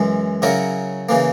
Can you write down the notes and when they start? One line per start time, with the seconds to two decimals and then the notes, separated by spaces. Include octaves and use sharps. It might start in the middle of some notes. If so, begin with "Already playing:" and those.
Already playing: F#2 E3 G#3
0.42 C#3 F#3 C#4 E4 A#4
1.09 C#3 E3 A#3